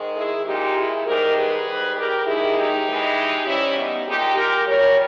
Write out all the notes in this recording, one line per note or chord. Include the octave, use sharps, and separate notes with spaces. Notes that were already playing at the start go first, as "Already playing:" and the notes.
Already playing: G#2 D#3 G#3
E4 G#4
A#2 G#3 D#4 G4
E4 G#4
G#2 D#3 G3 G4 A#4
G#4 B4
G#2 G3
G4 A#4
D#2 D#3 G#3 E4 G#4
D#4 G4
G2 E3 G#3
G#2 E3 G3 C#4 E4
B3 D#4
A#2 G#3 D#4 G4
G4 A#4
A#2 G3 A#4 C#5